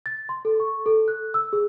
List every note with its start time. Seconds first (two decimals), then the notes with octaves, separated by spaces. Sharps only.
0.06 A6
0.29 C6
0.45 A4
0.60 C#6
0.86 A4
1.08 F#6
1.34 E6
1.53 G#4